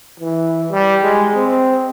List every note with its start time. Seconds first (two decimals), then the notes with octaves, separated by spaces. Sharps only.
0.20 E3
0.71 G3
1.03 G#3
1.35 C4